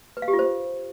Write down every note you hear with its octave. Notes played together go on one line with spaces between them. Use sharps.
B4
F5
G4
F4
C5